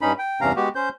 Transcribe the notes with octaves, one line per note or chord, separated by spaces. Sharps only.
G2 C#4 D#4 B5
G5
E2 G2 C3 C#4 F5 A#5
G#3 B3 F#4 G4
C#4 C5 G6